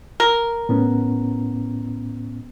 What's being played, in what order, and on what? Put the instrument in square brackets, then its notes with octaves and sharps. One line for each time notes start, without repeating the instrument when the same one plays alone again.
[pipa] A#4
[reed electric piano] A2 B3 C#4